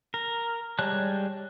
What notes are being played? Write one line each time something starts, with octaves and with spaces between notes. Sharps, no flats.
A#4
G3 G#3 C#5 A5 F#6